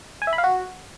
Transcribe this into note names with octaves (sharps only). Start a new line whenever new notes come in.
G#5
E5
B5
F5
F#4